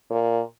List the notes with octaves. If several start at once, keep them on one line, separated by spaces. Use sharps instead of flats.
A#2